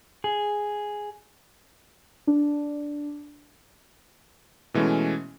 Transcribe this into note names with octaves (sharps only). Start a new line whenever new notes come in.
G#4
D4
B2 E3 G#3 A3 C#4